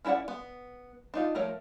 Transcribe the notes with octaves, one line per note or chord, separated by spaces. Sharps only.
C#4 E4 A4 D5 F#5
B3
D4 D#4 F4
F3 A3 A#4 C#5